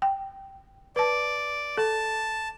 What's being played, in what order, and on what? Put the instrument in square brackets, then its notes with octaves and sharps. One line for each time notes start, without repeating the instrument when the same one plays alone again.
[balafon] G5
[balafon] B4 A5 [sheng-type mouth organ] D5
[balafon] A4 [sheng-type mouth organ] A5